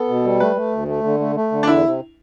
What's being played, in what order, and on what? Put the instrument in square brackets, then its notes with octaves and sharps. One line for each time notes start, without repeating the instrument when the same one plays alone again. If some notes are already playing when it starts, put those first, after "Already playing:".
Already playing: [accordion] B3 [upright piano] A4
[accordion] B2
G3
[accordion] A3 [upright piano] B4
[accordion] A3
D2
A3
D3
A3
A3
D3
[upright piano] D4
[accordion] E2 [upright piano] E4
[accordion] C3